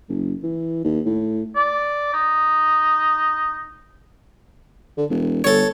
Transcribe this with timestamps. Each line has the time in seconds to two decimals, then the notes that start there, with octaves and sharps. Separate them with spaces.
0.09 F#1
0.43 E3
0.84 D#2
1.06 A2
1.56 D5
2.13 D#4
4.97 D3
5.10 E1
5.44 G1 A4 C#5